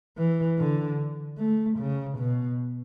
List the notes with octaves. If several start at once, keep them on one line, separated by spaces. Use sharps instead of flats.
E3
D3
A3
C#3
B2